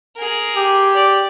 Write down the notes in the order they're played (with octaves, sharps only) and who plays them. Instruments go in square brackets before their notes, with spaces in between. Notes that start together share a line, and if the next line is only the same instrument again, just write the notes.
[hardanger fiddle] G#4 A#4
[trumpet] G4
[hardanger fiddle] D5